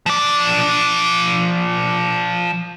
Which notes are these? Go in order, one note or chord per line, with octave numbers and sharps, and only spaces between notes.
F3 D5